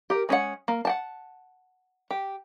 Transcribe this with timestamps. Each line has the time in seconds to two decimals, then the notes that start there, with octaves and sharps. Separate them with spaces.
0.10 G4 A#4
0.29 G#3 C#4 D4 F#5
0.68 A#3
0.85 F#5 G5 A5
2.11 G4